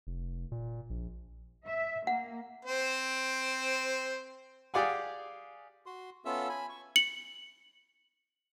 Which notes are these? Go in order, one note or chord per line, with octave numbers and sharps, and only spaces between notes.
F1
A#2
A#1
E5
A#3 F#5
C4 C5
G4 G#4 D5 F5 F#5 G#5
F#4 C6
B3 C#4 F4 A4 E5 E6
G#5 B5
C#6
C#7 F#7